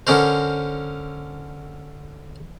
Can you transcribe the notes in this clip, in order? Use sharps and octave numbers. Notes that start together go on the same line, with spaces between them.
D3 C#4 A#4 C5